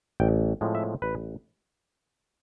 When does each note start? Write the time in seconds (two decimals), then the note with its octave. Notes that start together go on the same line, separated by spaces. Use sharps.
0.20 A1 G5
0.61 A2 F3 G#3 C4
0.75 E5
1.02 A1 B4